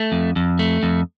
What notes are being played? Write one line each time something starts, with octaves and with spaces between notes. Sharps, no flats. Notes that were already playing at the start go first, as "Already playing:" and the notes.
Already playing: A3
F2
F2
A3
F2